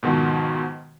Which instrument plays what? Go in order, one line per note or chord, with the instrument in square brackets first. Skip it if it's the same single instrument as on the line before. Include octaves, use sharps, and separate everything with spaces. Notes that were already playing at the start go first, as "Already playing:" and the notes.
[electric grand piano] G#2 B2 D#3 F3 F#4